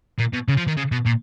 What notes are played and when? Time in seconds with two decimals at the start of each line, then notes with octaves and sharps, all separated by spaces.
0.19 A#2
0.33 B2
0.48 C#3
0.57 F3
0.67 D#3
0.77 C#3
0.92 B2
1.06 A#2